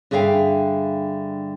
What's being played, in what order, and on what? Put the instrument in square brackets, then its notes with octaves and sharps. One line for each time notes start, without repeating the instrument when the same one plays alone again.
[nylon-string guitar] G2 D3 G#4 E5 F5 G5